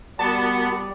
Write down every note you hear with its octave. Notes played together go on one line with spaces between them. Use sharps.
G3 B3 F#4 A#4 D5 A5 B5